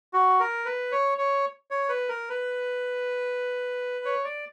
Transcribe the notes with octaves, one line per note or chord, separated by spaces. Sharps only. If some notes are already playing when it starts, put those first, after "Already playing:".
F#4
A#4
B4
C#5
C#5
C#5
B4
A#4
B4
C#5
D5